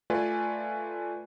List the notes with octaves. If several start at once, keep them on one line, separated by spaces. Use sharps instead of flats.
A3 F4 B4 D5 G#5